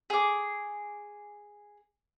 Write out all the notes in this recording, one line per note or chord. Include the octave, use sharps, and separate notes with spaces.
G#4 D6